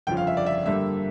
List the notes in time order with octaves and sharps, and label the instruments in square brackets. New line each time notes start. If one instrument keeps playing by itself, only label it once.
[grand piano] G1 F2 C#3 F3 G5
F5
E5
D5
E5
G2 D3 G3 A#3 E5